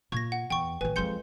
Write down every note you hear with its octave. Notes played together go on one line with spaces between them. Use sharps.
A#2 C#6 G#6 A#6
F#5
E2 G5 C#6
A1 D#3 B4 G#5
F2 G#3 C6 G6 C#7